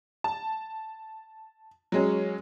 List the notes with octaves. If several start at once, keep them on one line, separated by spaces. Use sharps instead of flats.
A5
F#3 G#3 C#4